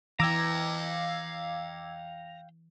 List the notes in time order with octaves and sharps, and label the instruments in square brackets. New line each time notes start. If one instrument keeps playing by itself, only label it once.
[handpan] E3 [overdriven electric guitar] F5 G5 [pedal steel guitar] A#5 [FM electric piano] D6 E6 G#6